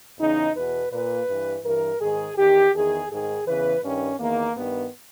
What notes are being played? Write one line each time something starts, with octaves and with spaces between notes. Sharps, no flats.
E2 C#3 E3 D#4
E2 B2 B4
A#2 B4
G2 E3
G2 E3 A#4
G#2 D#3 G#4
E2 D#3 G4
E2 D#3 G#4
G#2 D#3 G#4
E2 C#3 E3 B4
G2 D#3 C#4
E2 D#3 A#3
G2 D#3 B3